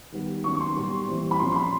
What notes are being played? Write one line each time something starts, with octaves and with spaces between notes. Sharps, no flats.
D#3 G3 B3
D#3 F#3 A#3 C#4 C#6
C#6
C6
A#2 G3 B3
E3 G3 C4
B5
A#2 F3 A#3 C#4 C6
C6
B5